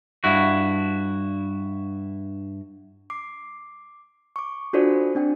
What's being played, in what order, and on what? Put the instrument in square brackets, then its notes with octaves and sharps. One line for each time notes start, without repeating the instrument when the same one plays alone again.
[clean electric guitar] G2 E4 F#4
[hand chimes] D6 C7
C#6 D6
D4 F4 F#4 A4 C5 D5
C4 D4 G5